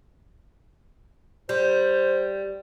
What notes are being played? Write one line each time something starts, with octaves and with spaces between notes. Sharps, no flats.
G3 C5